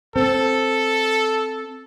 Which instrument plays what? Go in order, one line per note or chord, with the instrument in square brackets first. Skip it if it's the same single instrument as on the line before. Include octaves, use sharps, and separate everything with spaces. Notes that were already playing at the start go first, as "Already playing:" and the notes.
[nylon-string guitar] C4 [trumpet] A4